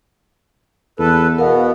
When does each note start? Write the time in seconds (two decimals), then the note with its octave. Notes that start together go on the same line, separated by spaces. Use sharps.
0.99 E2 A4 B4
1.38 B2 B3 A#4 F5